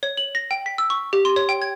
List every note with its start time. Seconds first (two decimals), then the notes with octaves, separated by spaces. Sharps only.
0.03 C#5
0.17 F#7
0.35 A#6
0.51 G5
0.66 B6
0.78 E6
0.90 C#6
1.13 G4
1.25 C6
1.36 C#5
1.49 G5
1.62 G#6